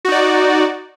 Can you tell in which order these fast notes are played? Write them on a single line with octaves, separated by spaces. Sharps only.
F#4 D#4 D5